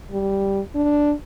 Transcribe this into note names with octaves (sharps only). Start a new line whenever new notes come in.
G3
D4